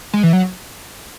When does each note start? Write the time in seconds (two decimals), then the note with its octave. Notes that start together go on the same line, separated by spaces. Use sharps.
0.13 G#3
0.23 E3
0.33 F#3